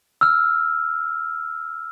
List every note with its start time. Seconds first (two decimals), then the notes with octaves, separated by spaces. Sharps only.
0.21 E6 F6